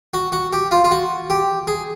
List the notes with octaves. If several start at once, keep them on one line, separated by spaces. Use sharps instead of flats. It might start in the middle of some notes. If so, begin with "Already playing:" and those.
F#4
F#4
G4
F4
F4
F#4
G4
G#4